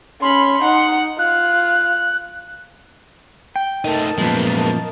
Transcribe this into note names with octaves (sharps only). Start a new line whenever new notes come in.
C#4 B5 C6
D#4 F#5
F4 F#6
G5
A3 D#4 A#4 D#5 A5
F#2 A#2 F3 G#3 B3